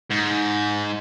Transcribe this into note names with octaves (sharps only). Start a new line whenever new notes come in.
G#2